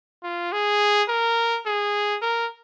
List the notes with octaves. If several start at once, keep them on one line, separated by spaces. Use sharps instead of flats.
F4
G#4
A#4
G#4
A#4